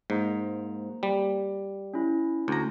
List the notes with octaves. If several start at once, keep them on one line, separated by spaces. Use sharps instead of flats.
G#2 A#3 C5 A#5
G3
C#4 E4
D2 A#5